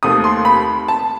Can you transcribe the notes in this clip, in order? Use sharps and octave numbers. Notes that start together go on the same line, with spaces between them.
D#2 D#3 A3 C4 D#6
C6
B5
A5